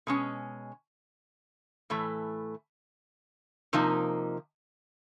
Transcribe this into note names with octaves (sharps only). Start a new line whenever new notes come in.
B2 G#3 C#4
A2 E3 A3
C3 F3 A#3 D#4